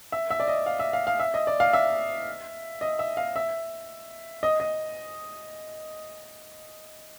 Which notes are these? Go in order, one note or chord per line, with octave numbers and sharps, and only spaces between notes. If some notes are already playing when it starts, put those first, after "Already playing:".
E5
E5
D5
D#5
F5
E5
F5
F5
E5
D#5
D5
F5
E5
D#5
E5
F5
E5
D#5
D#5